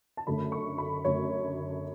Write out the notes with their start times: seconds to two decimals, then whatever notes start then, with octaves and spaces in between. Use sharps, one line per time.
0.17 A5
0.27 F#2 D3 A3 B5
0.52 C#6
0.78 B5
1.05 F#2 D3 A3 C#5